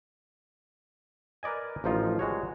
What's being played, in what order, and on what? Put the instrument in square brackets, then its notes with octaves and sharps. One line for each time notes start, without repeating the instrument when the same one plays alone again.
[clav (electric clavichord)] A#4 B4 D5 D#5 G#5
A1 F3 D#4 F4
G3 G#3 F#4 C#5